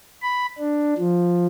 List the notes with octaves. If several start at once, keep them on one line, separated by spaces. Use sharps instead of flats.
B5
D4
F3